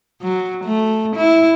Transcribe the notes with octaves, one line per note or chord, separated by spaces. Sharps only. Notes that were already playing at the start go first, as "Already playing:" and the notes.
F#3
A3
E4